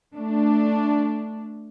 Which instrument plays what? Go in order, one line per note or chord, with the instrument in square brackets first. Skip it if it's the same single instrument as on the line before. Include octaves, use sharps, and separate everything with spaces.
[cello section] A3 D4